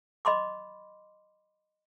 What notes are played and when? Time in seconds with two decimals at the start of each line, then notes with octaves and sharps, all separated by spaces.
0.25 D#5 B5 C6 D6